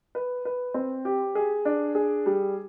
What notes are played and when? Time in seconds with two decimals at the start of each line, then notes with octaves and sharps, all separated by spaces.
0.15 B4
0.45 B4
0.74 C4
1.05 G4
1.35 G#4
1.65 D4
1.95 G#4
2.26 G3